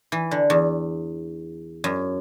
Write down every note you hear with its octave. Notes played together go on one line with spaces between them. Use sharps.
E3
D3
E2
F#2